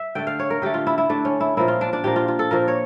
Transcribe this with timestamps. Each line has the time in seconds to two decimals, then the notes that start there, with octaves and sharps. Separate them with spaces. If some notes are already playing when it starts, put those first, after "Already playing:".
Already playing: E5
0.15 D3 A3 G5
0.27 F5
0.39 C#5
0.50 A#4
0.62 D3 A3 G4
0.74 F4
0.87 E4
0.98 E4
1.09 D3 A3 D4
1.25 C#4
1.41 E4
1.57 A#2 F3 A#3 E4
1.68 F4
1.81 D4
1.93 D4
2.04 A#2 F3 A#3 G4
2.16 F4
2.28 F4
2.39 A4
2.51 A#2 F3 A#3 A#4
2.68 C#5